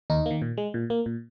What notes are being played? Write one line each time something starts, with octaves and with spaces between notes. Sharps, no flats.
D#2 D#4
D#3 A#3
A#2
G#3
A#2
A#3
A#2